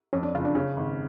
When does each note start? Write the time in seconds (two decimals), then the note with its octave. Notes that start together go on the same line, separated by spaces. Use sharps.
0.13 F2 C#4
0.23 D4
0.34 F#1 F4
0.45 D4
0.55 C#3 C#4
0.77 G#1